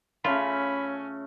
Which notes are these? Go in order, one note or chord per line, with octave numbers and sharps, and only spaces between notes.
C#3 A3 C#4 F4 B5